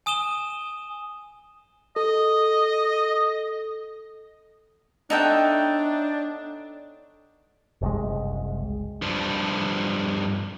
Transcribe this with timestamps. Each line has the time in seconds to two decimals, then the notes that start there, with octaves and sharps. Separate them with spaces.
0.06 G#5 D#6 D#7 E7 G7
1.96 A4 D#5
5.10 B3 D4 D#4 A4 C#5 E5 G5
7.81 F#1 C2 G#3
9.02 G2 F3